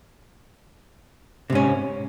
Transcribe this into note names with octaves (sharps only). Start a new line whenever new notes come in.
G#2 C3 C#4